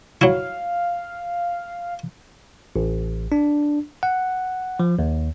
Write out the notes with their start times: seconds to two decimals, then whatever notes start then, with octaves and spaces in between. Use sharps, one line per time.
0.21 F#3 E4 F5
2.76 A1
3.32 D4
4.03 F#5
4.80 F3
4.99 D#2